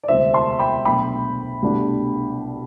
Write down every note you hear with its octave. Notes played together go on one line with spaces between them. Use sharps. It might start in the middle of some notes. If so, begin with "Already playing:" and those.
D5
E1 D2 C3 G3 C5 E5
A5 C6
G5 B5
B1 B2 A3 D4 G5 B5
C2 B2 A3 D4